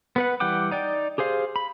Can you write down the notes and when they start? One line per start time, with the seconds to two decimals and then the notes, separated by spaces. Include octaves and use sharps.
0.16 B3 B4 F#5
0.40 E3 G3 F#5 G5 D6
0.71 D#4 D5 G5
1.18 G4 G#4 C5 F5
1.56 B5